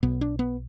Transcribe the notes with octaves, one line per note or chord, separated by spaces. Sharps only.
B1 B2 B3
D4
B3